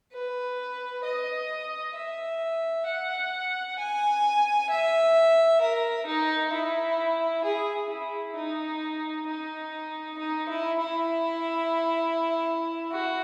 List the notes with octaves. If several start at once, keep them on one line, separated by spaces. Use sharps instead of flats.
B4
D#5
E5
F#5
G#5
E5
A#4
D#4
E4
G#4
E4
D#4
D#4
D#4
E4
E4
F#4